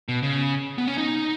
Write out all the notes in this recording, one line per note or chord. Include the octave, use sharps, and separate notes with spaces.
B2
C#3
B3
C#4
D#4